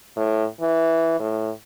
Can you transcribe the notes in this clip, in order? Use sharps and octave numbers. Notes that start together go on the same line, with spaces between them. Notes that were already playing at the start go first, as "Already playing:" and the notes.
A2
E3
A2